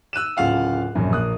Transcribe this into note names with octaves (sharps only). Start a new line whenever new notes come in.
E6 F#6 D#7 E7
D1 C#3 F4 F5 F#5
A#1 F#2
A#1 A#3 D#6 F#6